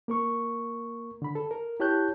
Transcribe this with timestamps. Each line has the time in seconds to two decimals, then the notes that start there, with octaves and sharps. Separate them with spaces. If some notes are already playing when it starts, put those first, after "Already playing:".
0.08 A#3 A#4 C#6
1.22 D3 B5
1.35 A4
1.51 A#4
1.80 E4 G4 C#5 A5 F#6 G6